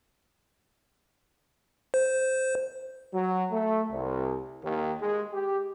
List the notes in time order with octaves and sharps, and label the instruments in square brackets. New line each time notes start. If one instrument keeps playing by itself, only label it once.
[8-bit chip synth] C5
[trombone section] F#3
A3
C2
D#2
G#3
G4